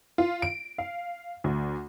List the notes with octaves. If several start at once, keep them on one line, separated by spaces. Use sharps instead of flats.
F4
D7
F5
D2